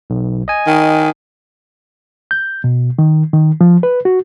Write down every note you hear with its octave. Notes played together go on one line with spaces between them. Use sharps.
B1
D#5 G#5
D#3
G6
B2
D#3
D#3
F3
B4
F#4